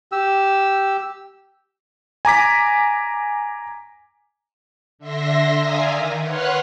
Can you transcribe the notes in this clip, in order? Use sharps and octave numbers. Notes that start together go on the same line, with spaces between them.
G4 E6
G#5 A#5 D6 B6
D3 E5 C6 A#6
D5 E5 F5 G#5 A#5 D#6
D#3
B4 C#5 F#5 C6 F6 F#6